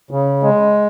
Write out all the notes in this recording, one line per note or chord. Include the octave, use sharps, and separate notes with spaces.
C#3
G#3